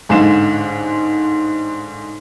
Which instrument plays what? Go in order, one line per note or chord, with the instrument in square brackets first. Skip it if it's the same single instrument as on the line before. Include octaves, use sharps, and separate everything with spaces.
[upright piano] A1 G#2 D3 G#3 F5 E7